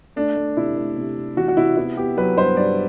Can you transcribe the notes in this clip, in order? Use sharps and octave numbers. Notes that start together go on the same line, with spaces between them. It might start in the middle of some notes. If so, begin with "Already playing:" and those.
A3 D4
A3
C3 E4
A3
C3
C3
E3 F#4
F#4
C3 E4
B3 E4
B3 G4
F#3 B4
G2 C5
G2 D5